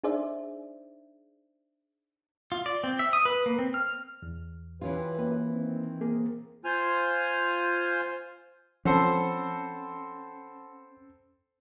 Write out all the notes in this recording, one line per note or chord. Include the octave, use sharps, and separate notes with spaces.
D4 D#4 G#4 C5 D5 E5
F4
D5
C4
E5
D#6
B4
A#3
C4
F6
E2
E3 C#4 F4 G4 B4
F#2 A#3 B4
D#3 C4
A#3 G#4 A#4
F4 C5 G#5 F6
F3 C4 C#4 A4 C5 F#5 A5 B5